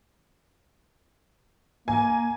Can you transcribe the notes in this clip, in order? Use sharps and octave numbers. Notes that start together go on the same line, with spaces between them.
A#3 G#5